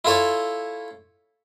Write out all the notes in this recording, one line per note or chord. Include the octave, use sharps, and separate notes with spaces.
E4 F4 A4 C#5